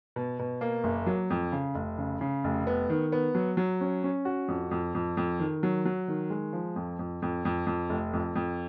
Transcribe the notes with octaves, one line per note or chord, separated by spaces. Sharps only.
B2
B2
A#3
F#1
F#3
F2
C#3
F1
C#3
C#3
F1
B3
D#3
B3
F#3
F#3
C#4
C#4
F#4
F2
F2
F2
F2
D#3
F#3
F#3
D#3
G#3
F3
F2
F2
F2
F2
F2
F1
F2
F2